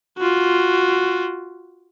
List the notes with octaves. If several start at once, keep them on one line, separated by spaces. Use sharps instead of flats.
F4 F#4